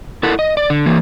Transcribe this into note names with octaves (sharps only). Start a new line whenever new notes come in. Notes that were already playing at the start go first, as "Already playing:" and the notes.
E4 A4 A#4 F#5
D#5
D5
D3
E3 A#3